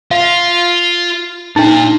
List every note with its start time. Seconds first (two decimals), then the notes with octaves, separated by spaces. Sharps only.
0.11 F4 F5
1.56 A#2 D4 D#4